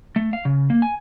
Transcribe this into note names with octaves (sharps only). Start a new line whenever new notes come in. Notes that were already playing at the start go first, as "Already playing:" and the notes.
A3
F5
C#3
A#3
G#5